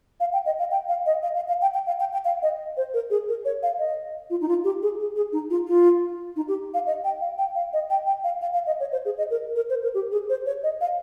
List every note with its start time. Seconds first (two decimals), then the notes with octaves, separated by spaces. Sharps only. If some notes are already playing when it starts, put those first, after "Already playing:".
0.20 F5
0.33 G5
0.46 D#5
0.59 F5
0.71 G5
0.89 F5
1.06 D#5
1.23 F5
1.36 F5
1.48 F5
1.62 G5
1.74 G5
1.87 F5
2.00 G5
2.13 G5
2.25 F5
2.43 D#5
2.77 C5
2.94 A#4
3.10 G#4
3.28 A#4
3.45 C#5
3.63 F5
3.79 D#5
4.30 F4
4.41 D#4
4.48 F4
4.64 G4
4.82 G#4
5.00 G#4
5.16 G#4
5.33 D#4
5.50 F4
5.68 F4
6.36 D#4
6.48 G4
6.74 F5
6.87 D#5
7.04 G5
7.21 F5
7.38 G5
7.55 F5
7.73 D#5
7.90 G5
8.07 G5
8.24 F5
8.41 F5
8.53 F5
8.66 D#5
8.80 C#5
8.92 C5
9.05 G#4
9.18 D#5
9.31 A#4
9.56 A#4
9.70 C5
9.83 A#4
9.94 G4
10.12 G#4
10.29 C5
10.46 C#5
10.63 D#5
10.81 F5